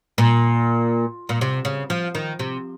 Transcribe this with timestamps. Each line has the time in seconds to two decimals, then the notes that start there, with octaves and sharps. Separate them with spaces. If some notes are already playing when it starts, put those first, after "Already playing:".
0.18 A#2
1.29 A#2
1.41 C3
1.65 C#3
1.90 F3
2.15 D#3
2.39 C3